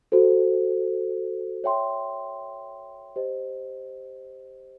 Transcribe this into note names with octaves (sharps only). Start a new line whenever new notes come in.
F#4 A4 C5
C#5 E5 G5 C6
G4 C5 D#5